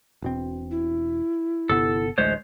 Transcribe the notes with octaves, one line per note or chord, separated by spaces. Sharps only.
E1 B2 C4
E4
G1 C3 B3 A4
A1 D2 G#3 C5 C#5